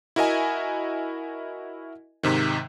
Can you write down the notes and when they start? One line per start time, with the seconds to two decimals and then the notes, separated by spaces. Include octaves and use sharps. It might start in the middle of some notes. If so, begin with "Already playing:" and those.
0.16 E4 F#4 A#4 D#5 E5 G#5
2.23 G#2 C3 D#3